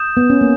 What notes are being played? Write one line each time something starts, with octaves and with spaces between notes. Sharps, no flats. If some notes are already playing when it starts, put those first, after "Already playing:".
Already playing: D#6 G6 E7
B3
C#4
A#3